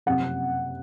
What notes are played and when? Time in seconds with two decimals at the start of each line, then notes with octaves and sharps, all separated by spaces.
0.06 F#1 F2 C3 F#5